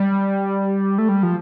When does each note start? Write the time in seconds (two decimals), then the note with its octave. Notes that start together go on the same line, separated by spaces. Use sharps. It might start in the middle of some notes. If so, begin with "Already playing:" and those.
Already playing: G3
0.98 A3
1.09 G3
1.23 F3